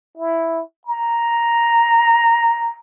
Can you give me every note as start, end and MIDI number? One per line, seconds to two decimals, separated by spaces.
0.17 0.61 64
0.87 2.76 82